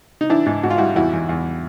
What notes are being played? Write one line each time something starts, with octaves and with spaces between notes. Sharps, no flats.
D#4
E3 D4 E4
G#2
G#2 F#4
F4
G3 E4 F#4
E2 E4 F#4
E2
E2